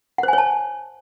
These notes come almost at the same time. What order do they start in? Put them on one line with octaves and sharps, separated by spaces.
F#5 C5 G#5 C#5 A5